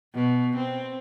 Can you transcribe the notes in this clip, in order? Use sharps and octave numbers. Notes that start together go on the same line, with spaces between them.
B2
C4